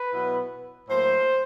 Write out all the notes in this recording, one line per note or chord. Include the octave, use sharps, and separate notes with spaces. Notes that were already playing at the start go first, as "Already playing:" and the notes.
Already playing: B4
B2 F#3 B3 E4
A2 F#3 A#3 C5